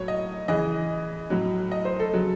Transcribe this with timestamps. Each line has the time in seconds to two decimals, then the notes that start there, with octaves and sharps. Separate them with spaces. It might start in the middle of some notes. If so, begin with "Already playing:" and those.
Already playing: A2 F#3 C#5
0.08 D#5
0.48 C#3 E3 D#5
1.30 A2 F#3
1.71 D#5
1.85 C5
2.00 A4
2.13 C#3 F#3